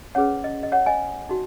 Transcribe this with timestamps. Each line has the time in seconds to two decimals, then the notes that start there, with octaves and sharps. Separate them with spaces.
0.15 C#4 G#4 B4 C#5 F#5
0.44 D#5
0.63 D#5
0.72 C#5 F#5
0.86 D#5 G#5
1.29 D#4 F#4